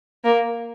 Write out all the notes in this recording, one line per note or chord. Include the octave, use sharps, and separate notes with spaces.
A#3